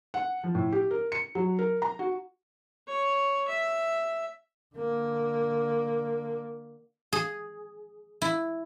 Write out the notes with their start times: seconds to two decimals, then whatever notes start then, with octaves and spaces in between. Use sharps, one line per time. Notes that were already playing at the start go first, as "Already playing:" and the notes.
0.14 F#5
0.44 F3
0.55 A2
0.72 G4
0.91 A#4
1.12 C#7
1.35 F#3
1.59 A#4
1.82 A#5
1.99 F#4
2.88 C#5
3.48 E5
4.76 D3 A#3
7.13 G#4
8.22 E4